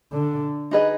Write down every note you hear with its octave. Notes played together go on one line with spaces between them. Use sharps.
D3
D#4 G#4 B4 D#5